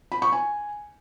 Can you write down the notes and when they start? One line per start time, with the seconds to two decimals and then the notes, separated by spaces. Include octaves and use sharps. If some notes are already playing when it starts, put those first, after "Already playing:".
0.12 B5
0.22 C#6
0.32 G#5